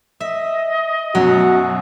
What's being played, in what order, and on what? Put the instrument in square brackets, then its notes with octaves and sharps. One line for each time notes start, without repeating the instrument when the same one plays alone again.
[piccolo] D#5 [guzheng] E5
[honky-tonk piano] F#2 B2 [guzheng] F#3 [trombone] F#4